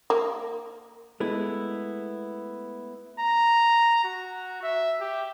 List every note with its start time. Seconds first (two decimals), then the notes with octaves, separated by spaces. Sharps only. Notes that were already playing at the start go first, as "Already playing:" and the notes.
0.10 A#3
1.20 G#3 A3 B3 E4
3.20 A#5
4.04 F#4
4.63 E5
5.00 G4